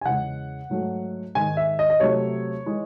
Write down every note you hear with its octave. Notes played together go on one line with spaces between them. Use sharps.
G#5
E2 C#3 G#3 F#5
G#2 F#3 A3
G#2 D#3 G#3 G#5
E5
D#5
D#5
C3 F#3 A3 C#5
E3 G#3